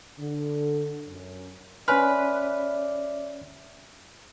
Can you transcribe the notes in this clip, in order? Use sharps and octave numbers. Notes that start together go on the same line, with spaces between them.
D3
F#2
C#4 B4 C#5 D5 E5 G#5 C6 F6